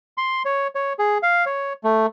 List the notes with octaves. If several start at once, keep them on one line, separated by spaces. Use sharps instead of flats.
C6
C#5
C#5
G#4
F5
C#5
A3